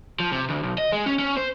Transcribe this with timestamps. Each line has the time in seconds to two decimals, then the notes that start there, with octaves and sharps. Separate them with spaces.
0.20 F3
0.32 C3
0.50 D2
0.63 B1
0.78 D#5
0.93 G#3
1.06 C#4
1.19 C#4
1.37 C5